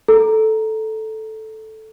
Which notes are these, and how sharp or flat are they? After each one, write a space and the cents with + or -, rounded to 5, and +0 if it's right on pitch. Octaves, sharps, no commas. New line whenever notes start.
A4 -5 A#5 +0